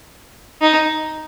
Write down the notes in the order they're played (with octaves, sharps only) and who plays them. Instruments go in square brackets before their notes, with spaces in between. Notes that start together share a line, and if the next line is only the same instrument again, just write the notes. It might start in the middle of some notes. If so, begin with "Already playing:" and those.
[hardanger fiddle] D#4